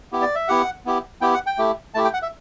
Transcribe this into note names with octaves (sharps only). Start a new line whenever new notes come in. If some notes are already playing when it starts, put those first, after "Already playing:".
B3 E4 G4
D5
E5
B3 E4 G4 F#5
B3 E4 G4
B3 E4 G4 G5
F#5
G5
A3 E4 G4
A3 E4 G4 A5
G5
F#5
E5